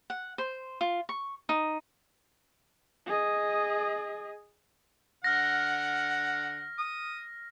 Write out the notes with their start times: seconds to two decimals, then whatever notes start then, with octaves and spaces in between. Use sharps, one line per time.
0.10 F#5
0.38 C5
0.81 F4
1.09 C#6
1.49 D#4
3.07 G#4 D#5
5.24 D3 F#5 F6 A#6
6.78 D#6